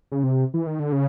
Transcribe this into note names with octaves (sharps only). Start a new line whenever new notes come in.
C#3
C3
E3
D#3
D3
C#3